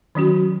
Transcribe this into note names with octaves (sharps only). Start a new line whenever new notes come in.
D#3 F#3 C#4 F#4